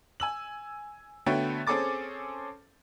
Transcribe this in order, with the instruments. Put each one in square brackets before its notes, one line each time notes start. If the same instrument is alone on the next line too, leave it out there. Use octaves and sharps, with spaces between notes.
[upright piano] G#5 E6 F#7
D3 A3 B3 F#4 C#5 G5
C4 C#4 G#4 A4 D6 A6